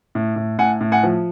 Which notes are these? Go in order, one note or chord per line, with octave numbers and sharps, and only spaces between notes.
A2
A2
A2 F#5 G#5
A2
F#5 G#5
F3